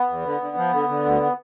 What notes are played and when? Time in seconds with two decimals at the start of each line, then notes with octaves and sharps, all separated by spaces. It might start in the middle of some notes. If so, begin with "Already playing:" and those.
Already playing: B3
0.09 E2
0.25 D3
0.41 D3
0.57 F3
0.73 D3
0.89 D3
1.05 D2